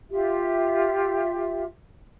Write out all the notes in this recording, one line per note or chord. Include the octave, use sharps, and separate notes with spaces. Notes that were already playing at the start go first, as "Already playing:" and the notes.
F4 G4 E5